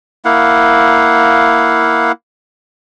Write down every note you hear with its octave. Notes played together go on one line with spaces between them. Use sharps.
A#3 E4 F5 F#5